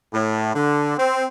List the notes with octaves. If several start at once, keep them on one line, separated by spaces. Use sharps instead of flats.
A2
D3
C4